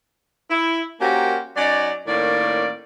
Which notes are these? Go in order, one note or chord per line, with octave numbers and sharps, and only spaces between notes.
E4
A#3 C#4 F#4 G4 A#4 C5
F#3 C#4 D#4 D5
A2 D#3 A#3 C#4 D5